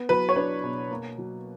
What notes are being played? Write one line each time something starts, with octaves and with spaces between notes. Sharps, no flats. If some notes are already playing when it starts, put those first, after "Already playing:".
Already playing: B3
F#3 B4
C#5
D4 B4
B2
A#3
F#3